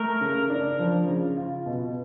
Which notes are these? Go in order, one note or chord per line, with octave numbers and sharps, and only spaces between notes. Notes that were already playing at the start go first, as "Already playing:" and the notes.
Already playing: A3 A#4
C#3
D4
F3
C#3
F4
B2